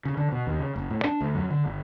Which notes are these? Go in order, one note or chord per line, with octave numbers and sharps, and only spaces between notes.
C#3
D3
B2
D#2
C#3
F#1
A2
D4
D2
F#2
D3
G1